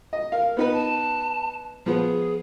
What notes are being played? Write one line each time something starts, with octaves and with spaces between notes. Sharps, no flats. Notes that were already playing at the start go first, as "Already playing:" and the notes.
D#5
A#4 F5
B3 D#4 B4
A5
F3 B3 G#4